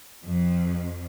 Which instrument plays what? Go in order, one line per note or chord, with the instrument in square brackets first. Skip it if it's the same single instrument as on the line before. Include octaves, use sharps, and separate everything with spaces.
[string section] F2